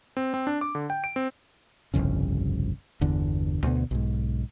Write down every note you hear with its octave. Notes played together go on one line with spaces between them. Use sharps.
C4
C4
D4
D6
D3
G5
D7
C4
G1 C2 F2 C#3
G1 E2 D3
D2 B2 D3 B3
B1 G#2